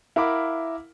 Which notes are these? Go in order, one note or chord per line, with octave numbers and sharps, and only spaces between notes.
E4 A#4 F5 F#5 B5 D6